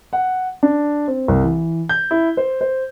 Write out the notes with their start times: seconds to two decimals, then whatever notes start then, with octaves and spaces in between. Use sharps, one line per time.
0.13 F#5
0.63 D4
1.08 C4
1.28 C2
1.44 E3
1.89 G6
2.11 E4
2.37 C5
2.61 C5